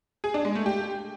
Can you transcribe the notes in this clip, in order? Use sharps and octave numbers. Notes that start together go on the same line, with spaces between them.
G#4
D4
G#3
A3
G4